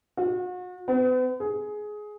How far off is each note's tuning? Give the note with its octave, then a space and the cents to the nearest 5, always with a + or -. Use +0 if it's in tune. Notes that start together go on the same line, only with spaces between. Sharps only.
F#4 -40
B3 +45
G#4 +15